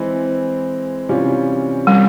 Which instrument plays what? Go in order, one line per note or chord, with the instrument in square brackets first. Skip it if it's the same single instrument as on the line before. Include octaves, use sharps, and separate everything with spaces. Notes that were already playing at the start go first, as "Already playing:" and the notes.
Already playing: [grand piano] E3 G#3 C4 E4
C3 E3 G3 C#4 F4
[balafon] G3